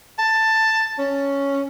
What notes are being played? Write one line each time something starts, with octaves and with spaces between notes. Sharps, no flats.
A5
C#4